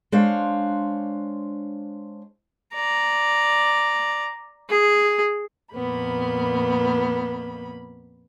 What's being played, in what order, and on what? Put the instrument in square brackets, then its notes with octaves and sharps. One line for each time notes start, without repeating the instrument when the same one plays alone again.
[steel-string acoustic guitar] G#3 D4 C5 C#5 F5
[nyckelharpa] D5 A#5
G#4
[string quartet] F2 A#2 A#3 B3 B5